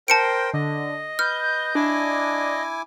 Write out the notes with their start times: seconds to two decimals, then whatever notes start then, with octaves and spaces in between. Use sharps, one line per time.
0.08 A#4 C5 G5 A5 C#7 D7
0.54 D3 D#5
1.19 B4 F6 G6
1.75 D4 E4 G#5 D6